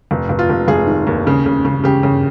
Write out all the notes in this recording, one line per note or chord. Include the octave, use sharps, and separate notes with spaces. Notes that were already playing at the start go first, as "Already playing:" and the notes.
F1
F1
F4
F1
F1 G#4
D#3
D#2
C#3
C#3
C#3
C#3 G4
C#3